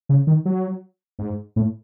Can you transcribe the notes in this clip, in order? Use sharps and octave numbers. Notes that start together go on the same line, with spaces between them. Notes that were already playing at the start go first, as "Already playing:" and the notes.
C#3
D#3
F#3
G#2
A2